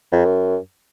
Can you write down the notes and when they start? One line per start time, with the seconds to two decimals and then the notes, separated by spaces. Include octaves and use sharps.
0.12 F2
0.25 F#2